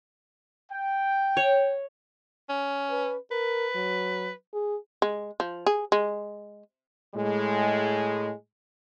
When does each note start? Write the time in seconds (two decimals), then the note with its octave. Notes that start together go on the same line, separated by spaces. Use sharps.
0.72 G5
1.37 C#5
2.49 C#4
2.90 B4
3.31 A#4 B4
3.75 F#3
4.53 G#4
5.02 G#3
5.40 F3
5.66 G#4
5.92 G#3
7.15 A2 G#3